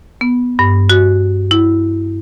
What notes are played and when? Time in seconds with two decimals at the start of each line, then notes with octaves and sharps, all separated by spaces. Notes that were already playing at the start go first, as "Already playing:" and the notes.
0.21 B3
0.59 G2
0.90 F#4
1.51 E4